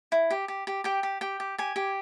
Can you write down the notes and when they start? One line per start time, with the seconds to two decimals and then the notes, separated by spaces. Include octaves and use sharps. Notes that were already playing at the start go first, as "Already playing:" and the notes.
0.12 E4
0.31 G4
0.48 G4
0.67 G4
0.84 G4 G5
1.03 G4
1.21 G4 G5
1.40 G4
1.58 G4 G#5
1.76 G4